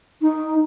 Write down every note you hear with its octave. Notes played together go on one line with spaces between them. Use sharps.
D#4